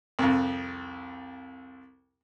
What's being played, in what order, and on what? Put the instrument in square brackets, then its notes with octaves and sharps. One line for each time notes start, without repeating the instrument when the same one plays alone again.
[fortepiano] C2 F2